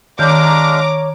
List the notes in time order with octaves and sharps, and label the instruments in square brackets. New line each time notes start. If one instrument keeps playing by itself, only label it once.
[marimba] D#3 G6 [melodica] G#3 D4 F5 [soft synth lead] C#5 [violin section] A#5 D6